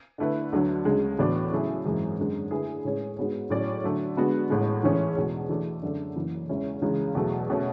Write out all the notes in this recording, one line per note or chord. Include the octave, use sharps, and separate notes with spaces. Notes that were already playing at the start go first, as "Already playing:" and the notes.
D3 A3 E4 B4
D2 D3 F#3
D2 C#3 G#3
A2 E3 B3 D4 F#4
C#3 F#3 A3 E4 G#4
G#1 F#2 E3 G#3
F#2 D3 G#3
D3 A3 E4 G#4 B4
A2 G#3 C#4 G#4 C#5
G#2 G#3 B3 F#4 C#5
A2 F#3 C#4 G#4 D5
D3 F#3 A3
D3 G#3 B3 F#4
A1 A2 G#3
G#2 E3 A3 C#4 G#4
E2 B2 G#3
E3 A3 D4
F#2 D3 A3 D4 A4
F#1 F#2 E3
E2 C#3 G#3 C#4 E4
C#2 C#3 E3 G#3
E2 B2 F#3 A3
B2 A3 C#4